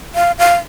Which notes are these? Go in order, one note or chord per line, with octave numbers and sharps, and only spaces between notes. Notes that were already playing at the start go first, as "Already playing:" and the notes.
F5
F5